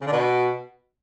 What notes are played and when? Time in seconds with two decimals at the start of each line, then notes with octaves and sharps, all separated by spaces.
0.02 C#3
0.07 D3
0.12 B2